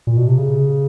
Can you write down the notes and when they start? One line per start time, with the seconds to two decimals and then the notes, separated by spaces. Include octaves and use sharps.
0.07 A#2
0.17 B2
0.28 C3
0.38 C#3